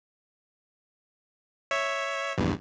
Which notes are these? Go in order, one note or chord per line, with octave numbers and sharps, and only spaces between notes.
C#5 E5
A#1 E2 G2